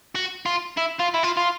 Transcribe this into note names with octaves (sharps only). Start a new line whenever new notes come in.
F#4
F4
E4
F4
E4
F4
F4